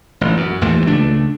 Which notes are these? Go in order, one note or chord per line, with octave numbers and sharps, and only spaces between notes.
A1
F#2
D#2 A2 E3 F3
C#2 A3 D4